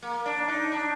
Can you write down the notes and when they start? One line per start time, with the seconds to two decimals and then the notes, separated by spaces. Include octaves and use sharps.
0.02 A#3
0.26 D4
0.48 D#4
0.72 D4